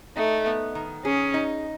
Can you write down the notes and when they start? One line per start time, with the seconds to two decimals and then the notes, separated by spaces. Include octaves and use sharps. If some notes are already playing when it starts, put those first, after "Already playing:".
0.16 A3 D#4
0.46 B3
0.75 D#3
1.05 C#4 G#4
1.34 D#4